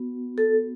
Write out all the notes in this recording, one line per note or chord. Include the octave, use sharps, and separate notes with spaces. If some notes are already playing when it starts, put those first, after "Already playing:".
Already playing: B3 F#4
A4